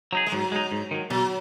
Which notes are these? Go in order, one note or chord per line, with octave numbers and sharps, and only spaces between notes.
F#3 D#4 G#4
G#3
G#2 F#3
G#3 D#4
G#2
D#3 F#3
B2 F#3